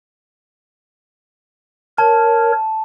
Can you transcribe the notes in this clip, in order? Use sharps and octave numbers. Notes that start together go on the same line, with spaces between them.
A#4 C#5 A5